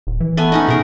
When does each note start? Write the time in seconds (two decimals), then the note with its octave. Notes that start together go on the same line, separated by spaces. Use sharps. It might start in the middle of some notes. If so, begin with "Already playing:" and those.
0.07 D#1
0.20 E3
0.37 A3 B3 G#5
0.52 C#4 D#4 D#5
0.68 B2 G#4 A#4